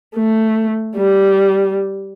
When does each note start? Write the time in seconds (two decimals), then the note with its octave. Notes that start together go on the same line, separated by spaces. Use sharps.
0.15 A3
0.96 G3